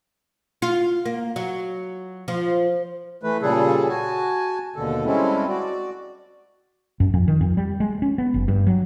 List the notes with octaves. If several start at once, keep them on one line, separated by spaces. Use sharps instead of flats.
F4
A#3
F#3
F3
E3 A3 B4
A#2 C#3 G3 G#4 A4
F#4 G#5 A5
D#2 B2 D3 A4
G3 G#3 C4 C#4 E4 A4
F#4 D5
F#2
F2
D#3
F2
G3
G#3
C#4
B3
F#1
G2
F#3